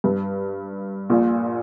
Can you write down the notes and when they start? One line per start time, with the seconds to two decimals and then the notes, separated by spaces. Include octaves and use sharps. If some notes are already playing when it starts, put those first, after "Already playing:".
0.04 G2
1.10 A#1 A#2